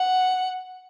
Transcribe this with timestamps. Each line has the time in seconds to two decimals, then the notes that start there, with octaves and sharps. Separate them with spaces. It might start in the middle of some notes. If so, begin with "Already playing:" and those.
Already playing: F#5